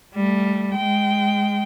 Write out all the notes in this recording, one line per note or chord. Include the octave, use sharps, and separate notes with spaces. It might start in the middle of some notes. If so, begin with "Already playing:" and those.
G3 A3
G#3 G5